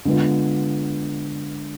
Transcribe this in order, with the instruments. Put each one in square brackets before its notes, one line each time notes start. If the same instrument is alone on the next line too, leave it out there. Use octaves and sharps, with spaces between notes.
[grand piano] D3 G#3 B3 F4